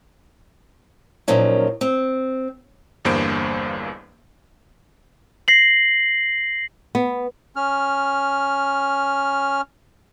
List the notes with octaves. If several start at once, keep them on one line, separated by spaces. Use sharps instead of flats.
A#2 D#3 F3 F#3 C#4
C4
G1 E2 G2 A#3 C5 D7
A#6 C7 F#7
B3
C#4 F6